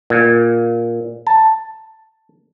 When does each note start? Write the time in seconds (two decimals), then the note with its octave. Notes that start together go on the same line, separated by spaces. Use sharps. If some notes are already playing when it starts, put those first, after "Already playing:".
0.10 A#2
1.27 A5